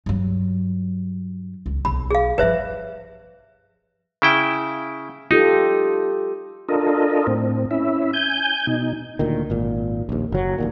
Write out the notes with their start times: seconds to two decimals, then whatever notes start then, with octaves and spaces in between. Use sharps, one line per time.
0.06 G2 F#3
1.66 C#2
1.85 B1 B5
2.11 G#4 F5
2.38 G2 F3 B4 C5 E5
4.22 C#3 E4 G5
5.31 D#4 F4 G4 A4
6.68 D4 F4 A4 A#4 D#5
7.27 A2 C4
7.71 C#4 E4 E5
8.13 G#5 G6
8.67 B2 D#4
9.19 D2 A#2 D#3
9.50 G#1 A#2
10.09 A#1 D#2
10.32 F#1 F#3
10.58 F1 D#2 A#2